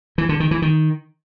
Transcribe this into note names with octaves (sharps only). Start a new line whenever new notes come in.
E3
D3
D#3
E3
D#3